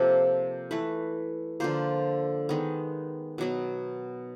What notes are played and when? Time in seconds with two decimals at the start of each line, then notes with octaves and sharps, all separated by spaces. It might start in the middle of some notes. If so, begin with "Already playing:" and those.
Already playing: C3 F3 A#3 A4
0.71 E3 A3 B4
1.60 D3 F3 A#3 C5
2.49 D#3 G#3 B3
3.38 B2 F#3 B3